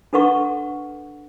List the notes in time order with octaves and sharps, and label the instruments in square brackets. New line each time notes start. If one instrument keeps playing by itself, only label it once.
[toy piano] D4 A4 B4 F#5 C#6